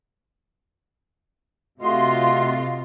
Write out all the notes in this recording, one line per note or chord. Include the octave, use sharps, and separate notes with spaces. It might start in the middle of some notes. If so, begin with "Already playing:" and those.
C3 A3 F4 F#4 D#5 C6